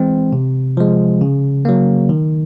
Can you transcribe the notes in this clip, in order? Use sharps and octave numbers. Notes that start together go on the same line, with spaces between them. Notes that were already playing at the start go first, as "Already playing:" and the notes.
Already playing: E3 G#3 C4
C3
F3 G#3
C#3
F#3 A#3
D#3